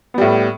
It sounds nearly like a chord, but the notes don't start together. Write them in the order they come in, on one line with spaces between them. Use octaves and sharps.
B3 G3 A2